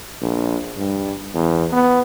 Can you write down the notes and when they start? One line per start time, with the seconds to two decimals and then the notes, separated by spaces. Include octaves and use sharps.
0.21 A#1
0.77 G2
1.35 E2
1.72 B3